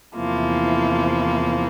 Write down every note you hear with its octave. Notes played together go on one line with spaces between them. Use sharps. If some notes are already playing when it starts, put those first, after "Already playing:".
E2 C3 F3 A#3 E4